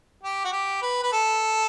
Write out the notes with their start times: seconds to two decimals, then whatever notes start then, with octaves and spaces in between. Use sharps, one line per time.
0.23 G4
0.45 F#4
0.53 G4
0.82 B4
1.03 B4
1.13 A4